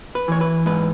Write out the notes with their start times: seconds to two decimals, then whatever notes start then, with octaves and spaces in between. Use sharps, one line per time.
0.15 B4
0.28 E3 C#5
0.41 B4
0.66 G#2 B4